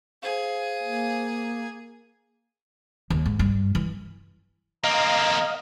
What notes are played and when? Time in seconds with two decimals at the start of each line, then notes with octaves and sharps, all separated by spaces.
0.23 G#4 C5 F5
0.83 A#3
3.10 D#2
3.26 G#2
3.39 G2
3.75 E3
4.84 A#3 C4 D#5 F5 A#5